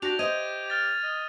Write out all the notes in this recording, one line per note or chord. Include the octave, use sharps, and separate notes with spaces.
D4 F#4 G4 A#6 F7
C5 D#5 G#6 D#7
F6 A6
D#5